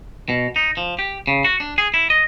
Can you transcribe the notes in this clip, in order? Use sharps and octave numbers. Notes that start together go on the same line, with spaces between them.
B2
D#4
F3
G4
C#3
F#4
D4
G#4
E4
D#5